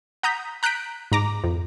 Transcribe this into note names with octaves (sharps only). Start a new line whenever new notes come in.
F#5 A#5 D#6 G6 B6
A#5 F#6 G6 B6 D7
G#2 A#5 D6
F2